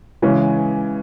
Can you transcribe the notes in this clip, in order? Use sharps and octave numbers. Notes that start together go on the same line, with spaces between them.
C#3 E3 G#3 C#4